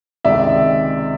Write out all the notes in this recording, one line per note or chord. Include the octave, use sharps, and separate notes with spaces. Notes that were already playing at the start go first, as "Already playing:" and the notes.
C#2 C3 D#3 G#3 D5 E5